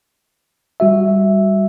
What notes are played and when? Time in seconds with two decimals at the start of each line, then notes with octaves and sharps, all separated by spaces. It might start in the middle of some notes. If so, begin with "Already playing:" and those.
0.80 G3 F#4 E5